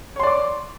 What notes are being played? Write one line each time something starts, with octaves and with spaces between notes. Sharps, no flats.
C#5 D5 C6 D6